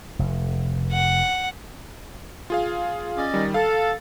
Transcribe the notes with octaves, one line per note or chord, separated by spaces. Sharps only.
F1
F#5
F4 G#4 F5
C#4 D5 D#5
D#3 G3
A4 F5